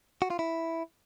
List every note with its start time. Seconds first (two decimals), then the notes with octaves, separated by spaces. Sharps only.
0.22 F#4
0.30 F4
0.39 E4